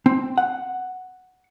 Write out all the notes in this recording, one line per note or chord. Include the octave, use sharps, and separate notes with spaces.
C4
F#5